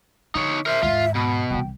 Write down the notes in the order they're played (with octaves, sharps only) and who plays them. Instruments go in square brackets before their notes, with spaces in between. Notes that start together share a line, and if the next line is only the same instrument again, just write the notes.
[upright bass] D3 [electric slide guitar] D#4 C#5
[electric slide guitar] A#4 C5 [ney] E5
[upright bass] D#2 G#2 [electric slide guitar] F4
[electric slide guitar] B2 [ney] B5
[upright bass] C2 E3 [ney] G5